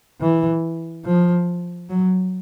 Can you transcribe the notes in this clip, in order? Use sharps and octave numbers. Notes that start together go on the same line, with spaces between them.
E3
F3
F#3